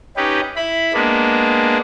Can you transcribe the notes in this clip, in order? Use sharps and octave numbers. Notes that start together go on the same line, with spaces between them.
C#4 D#4 G4 B4
E4 B5
G#3 A#3 B3 D4